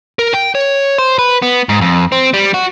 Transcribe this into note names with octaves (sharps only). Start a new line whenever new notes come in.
A#4
G5
C#5
C5
B4
B3
G#2
F2
C4
G3
F#4